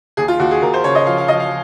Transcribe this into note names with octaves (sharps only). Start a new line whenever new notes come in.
D#2 G#4
F4
D#2 F#4
G#4
D#2 A#4
C5
C#3 C#5
D#5
F3 F5
F5
F3 D#5
F5